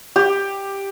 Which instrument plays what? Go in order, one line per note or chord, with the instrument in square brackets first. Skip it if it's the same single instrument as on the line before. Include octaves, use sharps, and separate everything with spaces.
[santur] G4